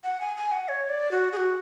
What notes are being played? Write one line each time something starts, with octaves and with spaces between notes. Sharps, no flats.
F#5
G#5
G#5
F#5
C#5
D5
F#4
G#4
F#4